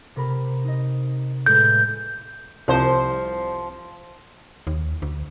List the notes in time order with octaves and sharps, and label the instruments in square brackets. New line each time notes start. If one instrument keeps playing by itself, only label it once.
[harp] C3 A#4 B5
D#4 D#5
[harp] A2 G#3 B4 [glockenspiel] G6
[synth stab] C2 C5 [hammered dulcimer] F3
[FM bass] D#2
D2